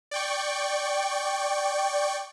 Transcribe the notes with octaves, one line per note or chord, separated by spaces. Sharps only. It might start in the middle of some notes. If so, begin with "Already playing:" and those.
D5 G5 C#6